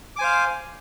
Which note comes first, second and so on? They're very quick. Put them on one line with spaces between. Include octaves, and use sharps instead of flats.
D6 G#5 C5 F5